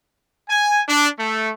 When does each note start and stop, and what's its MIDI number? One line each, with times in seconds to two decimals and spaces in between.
0.49 0.81 80
0.88 1.07 62
1.19 1.51 57